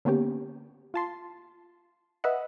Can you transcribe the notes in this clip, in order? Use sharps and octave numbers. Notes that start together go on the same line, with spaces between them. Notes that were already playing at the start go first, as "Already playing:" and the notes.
D3 A#3 B3 C#4 G4
F4 A5 C6
B4 D#5 E5 F#5